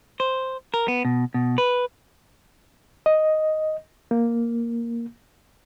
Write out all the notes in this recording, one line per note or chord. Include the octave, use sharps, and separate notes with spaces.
C5
A#4
B3
B2
B2
B4
D#5
A#3